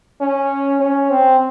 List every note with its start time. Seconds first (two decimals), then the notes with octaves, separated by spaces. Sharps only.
0.21 C#4
0.80 C#4
1.10 C4